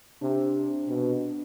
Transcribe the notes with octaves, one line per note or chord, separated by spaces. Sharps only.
C3 D4
B2